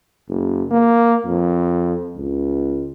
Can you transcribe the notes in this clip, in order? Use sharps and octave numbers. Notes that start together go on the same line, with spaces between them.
F#1
A#3
F2
C#2